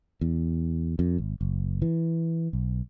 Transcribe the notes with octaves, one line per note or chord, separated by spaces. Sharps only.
E2
F2
G#1
F#1
E3
B1